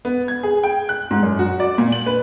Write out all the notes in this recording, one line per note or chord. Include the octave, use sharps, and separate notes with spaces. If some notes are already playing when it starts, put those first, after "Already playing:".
B3
G#6
G#4
G5
F#6
G#2
F#2
F#4
D5
A#2
F#7
B4